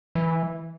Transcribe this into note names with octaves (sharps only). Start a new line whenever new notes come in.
E3